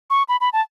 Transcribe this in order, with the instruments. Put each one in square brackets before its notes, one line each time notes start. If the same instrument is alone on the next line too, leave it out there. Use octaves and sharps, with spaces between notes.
[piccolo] C#6
B5
B5
A5